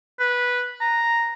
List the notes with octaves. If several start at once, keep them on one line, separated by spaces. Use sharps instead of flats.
B4
A#5